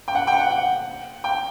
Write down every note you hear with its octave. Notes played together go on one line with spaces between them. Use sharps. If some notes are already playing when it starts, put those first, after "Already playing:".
G5
F#5
G5
F#5
F#5
G5